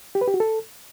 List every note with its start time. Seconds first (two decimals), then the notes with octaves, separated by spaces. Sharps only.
0.15 G4
0.21 B4
0.28 G4
0.34 F#4
0.40 A4